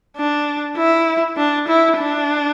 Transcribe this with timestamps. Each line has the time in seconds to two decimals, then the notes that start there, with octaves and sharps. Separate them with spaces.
0.17 D4
0.77 E4
1.37 D4
1.67 E4
1.98 D4